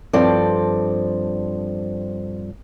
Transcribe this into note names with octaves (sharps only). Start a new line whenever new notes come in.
G2 F3 C4 A4 D5